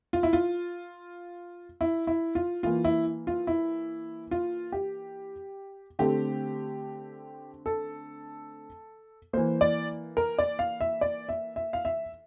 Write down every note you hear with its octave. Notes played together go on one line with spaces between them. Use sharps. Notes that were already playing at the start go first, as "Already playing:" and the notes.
F4
E4
F4
E4
E4
F4
E3 A#3 F4
E4
F4
E4
F4
G4
D3 A3 C4 G4
A4
E3 A#3 C5
D5
A#4
D5
F5
E5
D5
E5
E5
F5
E5